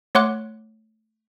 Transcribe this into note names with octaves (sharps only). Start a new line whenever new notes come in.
A3 C#5 F#5 C6 D6 F#6